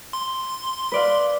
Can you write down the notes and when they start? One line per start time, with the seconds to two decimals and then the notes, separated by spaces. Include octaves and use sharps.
0.13 C6
0.92 B4 D5 F5